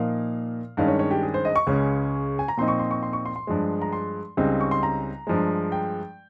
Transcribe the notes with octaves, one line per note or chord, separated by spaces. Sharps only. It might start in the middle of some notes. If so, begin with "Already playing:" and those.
Already playing: A#2 F3 A#3 D#4 F5
G2 D#3 G#3 C#4 F5
C#5
C#5
G4
G#4
C5
D#5
C#6
C#2 C#3 G#3 C#4
G#5
A#5
A#2 F3 C4 D#4 C6
C#6
C6
C#6
C6
C#6
C6
C6
G2 F3 G#3
A#5
C6
C#2 C#3 G3 C4 D#4
C#6
C6
A#5
G2 F3 G#3
G5